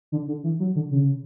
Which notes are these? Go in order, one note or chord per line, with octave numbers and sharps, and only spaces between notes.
D3
D3
E3
F#3
D3
C#3